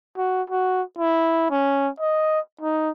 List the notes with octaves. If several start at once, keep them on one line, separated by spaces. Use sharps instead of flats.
F#4
F#4
E4
C#4
D#5
D#4